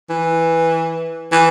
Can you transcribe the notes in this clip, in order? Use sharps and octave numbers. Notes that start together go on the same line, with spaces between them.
E3
E3